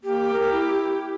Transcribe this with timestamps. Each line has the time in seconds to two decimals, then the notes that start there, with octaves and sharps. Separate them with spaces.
0.04 A#3 G4
0.34 A#4
0.52 E4